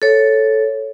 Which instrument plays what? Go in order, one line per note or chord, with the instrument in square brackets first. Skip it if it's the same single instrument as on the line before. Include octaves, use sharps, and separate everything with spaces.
[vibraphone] A4 C#5